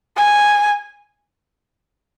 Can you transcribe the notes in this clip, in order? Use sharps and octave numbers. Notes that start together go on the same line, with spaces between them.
G#5